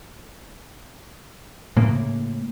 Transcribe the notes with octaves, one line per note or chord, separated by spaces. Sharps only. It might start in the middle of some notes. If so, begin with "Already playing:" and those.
A2 C#3 A#3